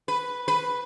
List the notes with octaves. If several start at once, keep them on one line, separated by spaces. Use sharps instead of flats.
B4
B4